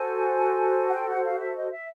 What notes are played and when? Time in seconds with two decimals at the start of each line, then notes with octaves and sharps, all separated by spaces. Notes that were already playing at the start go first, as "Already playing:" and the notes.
Already playing: F#4 A4 C5 G#5
0.89 F#5
0.94 G5
1.09 F#5
1.25 F5
1.40 E5
1.56 D#5
1.71 E5